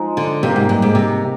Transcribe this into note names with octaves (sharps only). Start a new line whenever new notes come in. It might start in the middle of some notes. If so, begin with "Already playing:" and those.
Already playing: F3 G#3 D#4
D3
C3 A#3 D#4 G4
G#2
G2
G#2
C3